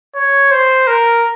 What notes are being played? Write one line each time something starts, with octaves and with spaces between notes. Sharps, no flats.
C#5
C5
A#4